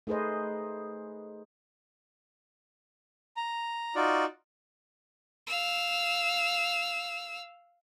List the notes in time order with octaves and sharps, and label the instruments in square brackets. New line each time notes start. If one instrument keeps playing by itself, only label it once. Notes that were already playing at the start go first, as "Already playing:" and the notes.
[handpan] A3 D#4 G#4 B4 C5 D#5
[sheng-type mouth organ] A#5
D#4 F4 F#4 D5
[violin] F5 E6